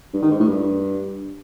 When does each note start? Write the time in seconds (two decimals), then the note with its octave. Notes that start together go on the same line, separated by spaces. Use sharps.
0.14 G2
0.22 D#3
0.31 G#2
0.39 A2
0.48 G2